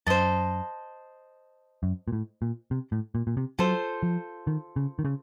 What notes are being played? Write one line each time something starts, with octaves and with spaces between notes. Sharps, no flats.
F#2 C5 D#5 A5
F#2
A#2
A2
A#2
C3
A2
A#2
A#2
C3
F#3 F4 A4 C5
F3
D#3
C#3
D#3
C#3